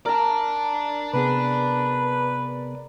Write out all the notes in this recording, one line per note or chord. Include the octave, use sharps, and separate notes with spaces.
A#4 D5 A5 A#5
C3 B3 G#4 B4